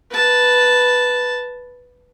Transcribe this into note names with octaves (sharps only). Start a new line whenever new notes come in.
B4 A5